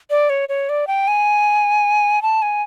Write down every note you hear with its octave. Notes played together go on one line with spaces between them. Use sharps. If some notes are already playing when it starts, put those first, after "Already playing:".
D5
C#5
C#5
D5
G5
G#5
A5
G#5